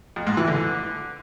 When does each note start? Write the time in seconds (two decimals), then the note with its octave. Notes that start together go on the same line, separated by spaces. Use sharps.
0.16 F2
0.27 G#2
0.37 E3
0.48 D3